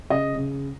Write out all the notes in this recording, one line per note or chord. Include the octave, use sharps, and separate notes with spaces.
C#3 D#5
C#3